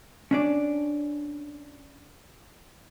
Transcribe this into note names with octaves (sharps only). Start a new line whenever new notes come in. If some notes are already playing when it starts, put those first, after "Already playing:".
C#4 D4 D5